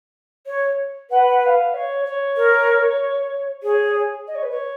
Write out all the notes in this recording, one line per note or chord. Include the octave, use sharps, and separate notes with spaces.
C#5
B4 F#5
F#5
F5
C#5
C#5
A#4
G#4 C#5
D#5
C#5
B4
C#5